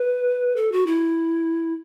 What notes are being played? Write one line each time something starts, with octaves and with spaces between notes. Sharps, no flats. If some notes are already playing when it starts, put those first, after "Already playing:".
Already playing: B4
A4
F#4
E4